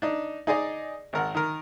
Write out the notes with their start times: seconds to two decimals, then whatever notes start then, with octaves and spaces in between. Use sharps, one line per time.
0.02 D4 D#4
0.47 D#4 G#4 D5 D#5
1.13 G#1 A#4 F#5
1.35 D#3 A#4